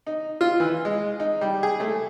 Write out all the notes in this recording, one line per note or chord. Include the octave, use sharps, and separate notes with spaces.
D#4
F4
E3
G#3
D#4
G3
G#4
A3